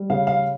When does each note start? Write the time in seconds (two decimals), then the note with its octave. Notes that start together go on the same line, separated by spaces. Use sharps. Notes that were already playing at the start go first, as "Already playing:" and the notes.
Already playing: G3
0.10 C#3 F5
0.27 F5